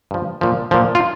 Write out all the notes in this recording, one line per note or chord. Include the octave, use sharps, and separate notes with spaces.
G2 F3
A#2 F3
A#2 F3
F4